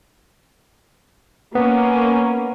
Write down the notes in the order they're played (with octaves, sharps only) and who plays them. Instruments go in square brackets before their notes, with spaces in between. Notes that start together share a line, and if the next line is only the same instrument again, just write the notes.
[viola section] A#3 C#4 [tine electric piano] B3